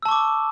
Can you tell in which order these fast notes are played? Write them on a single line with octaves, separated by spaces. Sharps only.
E6 A5 C#6 D6